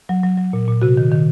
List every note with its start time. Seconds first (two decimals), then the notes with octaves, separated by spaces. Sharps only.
0.09 F#3
0.23 F#3
0.38 F#3
0.53 A#2
0.68 A#2
0.82 C3 F#4
0.97 D#3
1.12 D#3